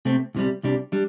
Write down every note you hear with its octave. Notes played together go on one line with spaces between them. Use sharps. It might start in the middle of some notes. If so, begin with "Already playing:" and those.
C3 A3 C4
C2 C3 G3
C2 C3 G3 D4
G3 D4